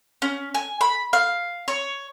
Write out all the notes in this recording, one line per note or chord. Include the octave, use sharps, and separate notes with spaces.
C#4
G#5
B5
F5
C#5